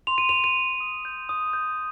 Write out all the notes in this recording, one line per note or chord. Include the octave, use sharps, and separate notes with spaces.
C6 F7
D#7
C6 F7
D#7
C6
D#6
G6
D#6
G6